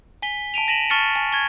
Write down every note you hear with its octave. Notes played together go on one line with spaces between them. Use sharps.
G#5 B6 G7
A5 D7 D#7 F7
A#6 B6 D#7 E7 F#7
A5 C#6 F6 A6 C#7
G#5
C#6 G#6